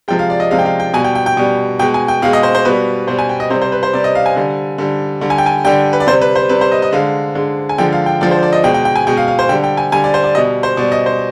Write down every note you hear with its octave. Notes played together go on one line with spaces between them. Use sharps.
C3 F3 G#3 G5
F5
D5
D#5
C3 F3 G#3 F5
G5
F5
G5
B2 G3 G#5
G5
G5
G5
B2 G3
B2 G#3 G5
G#5
G5
B2 G#3 F5
D#5
C5
C5
B2 G3 B4
B2 G3 C5
G#5
G5
D#5
C3 G3 C5
C5
B4
C5
C3 G3 D5
D#5
F5
G#5
D3 G3
D3 G3
D3 G3
G#5
G5
G#5
D3 G3 G5
B4
D5
C3 G3 C5
B4
C5
C3 G3 B4
C5
D#5
D#5
D3 G#3 F5
D3 G#3
G#5
D3 F3 G#3 G5
F5
G5
D3 F3 G#3 D5
C5
D5
D#5
B2 G#3 G5
G5
G5
G#5
B2 G#3 G5
F5
F5
C5
D3 G3 G5
G5
G#5
D3 G3 G#5
D5
C5
D5
B2 G3 D#5
C5
B2 G3 D5
D#5
C5